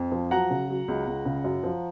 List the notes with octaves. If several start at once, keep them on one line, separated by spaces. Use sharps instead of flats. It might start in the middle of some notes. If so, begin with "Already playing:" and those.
Already playing: F2
F3
F#3 F#5 A#5
C#3
F#3
C#2
C#2
C#3
F#2
F3